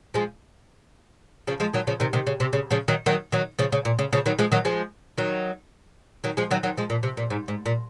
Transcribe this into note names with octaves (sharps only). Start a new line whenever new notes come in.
F3 G#3
C#3 F3
F3 G#3
D#3 F#3
C#3 F3
C3 D#3
C3 D#3
C#3
C3
C#3
C#3 F3
D#3 F#3
D#3 F#3
D#3 F#3
C#3 F3
C#3
A#2
C#3
C#3 F3
D#3 F#3
F3 G#3
D#3 F#3
F3 G#3
D#3 F#3
D#3 F#3
F3 G#3
D#3 F#3
D#3 F#3
F3 G#3
A#2
C3
A#2
G#2
G#2
A#2